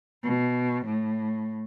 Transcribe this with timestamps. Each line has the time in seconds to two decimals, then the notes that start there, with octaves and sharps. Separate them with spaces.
0.23 B2
0.86 A2